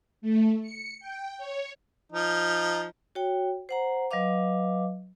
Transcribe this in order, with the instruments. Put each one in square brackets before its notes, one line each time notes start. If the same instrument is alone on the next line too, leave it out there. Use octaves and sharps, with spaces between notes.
[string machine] A3
C#7
G5
C#5
[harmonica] F3 D#4
[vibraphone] F#4 C#5 G5
C5 F#5 A#5
F#3 B4 D#5 F5 D6